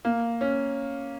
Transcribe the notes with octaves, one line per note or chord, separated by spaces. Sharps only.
A#3
C#4